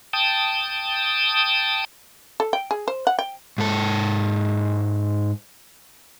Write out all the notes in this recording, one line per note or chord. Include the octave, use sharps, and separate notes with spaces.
G5 A5 D#6
A4
G5
G#4
C5
F#5
G5
G#2 A4